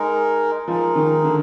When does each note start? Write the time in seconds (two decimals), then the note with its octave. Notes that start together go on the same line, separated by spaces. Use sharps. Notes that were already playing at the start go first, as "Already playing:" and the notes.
Already playing: G#3 D#4 A#4
0.68 F3 G#3 D#4 A#4
0.96 D#3
1.25 D3